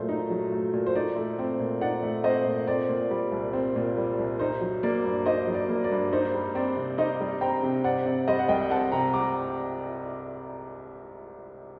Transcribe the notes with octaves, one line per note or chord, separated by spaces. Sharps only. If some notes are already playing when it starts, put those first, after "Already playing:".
Already playing: A#2 F#3 A3 C5
D#4
F#3
A3
A#2
C5
D#4 D5
A3
C4
A#2
D#4 D5 F#5
A3
C4 C5 D#5
A#2
C4 D5
A#2
G3
C2
C4
A#2
G3
C2
D#4 C5
F#3
A#3 D5
G2
D#4 C5 D#5
F#3
D5
A#3
D5
G2
D#4 C5
G3
C4 D5
C3
D#4 C5 D#5
G3
C4 G5 A#5
C3
C4 D5 F#5
C3 D5
G3 C5 D#5
F#5
C2 D#5 G5
C4 F#5 A5
C3 G5 A#5
G3 A#5 D6